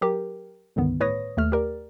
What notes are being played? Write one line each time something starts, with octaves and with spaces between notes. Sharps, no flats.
F#3 G4 A#4
C#2 G2 D3 D#3 B3
A2 B4 C#5 D#6 A#6
D#2 A3 F6
G4 A#4 D5